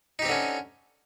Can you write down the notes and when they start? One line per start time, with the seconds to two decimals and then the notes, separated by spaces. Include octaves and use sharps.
0.19 D#4
0.22 G4
0.25 C4
0.28 D3
0.31 C#4